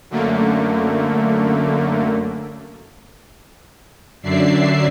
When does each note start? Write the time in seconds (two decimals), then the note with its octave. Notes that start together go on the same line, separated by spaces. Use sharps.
0.10 F#2 D3 A3 A#3
4.22 F#2 D3 F#3 D5 E5 C7